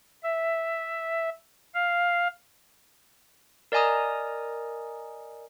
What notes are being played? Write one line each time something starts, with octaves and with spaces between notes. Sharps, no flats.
E5
F5
A#4 D5 D#5 G#5 A#5 D#6